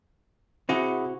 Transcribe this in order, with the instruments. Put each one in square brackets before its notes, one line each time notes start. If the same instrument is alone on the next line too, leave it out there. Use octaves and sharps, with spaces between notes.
[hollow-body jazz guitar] C3 F#4 [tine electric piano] E4 G#4 F#5